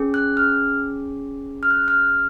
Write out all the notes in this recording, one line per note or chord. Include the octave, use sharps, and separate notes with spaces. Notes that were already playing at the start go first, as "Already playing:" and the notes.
Already playing: C#4 G#4
F#6
F6
F6
F#6
F6